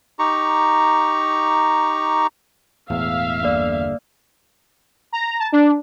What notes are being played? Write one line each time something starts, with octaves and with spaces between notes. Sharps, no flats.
D#4 G4 A#5 C#6
E1 E2 A2 E5 F5
G1 D3 A#3 D5
A#5
A5
D4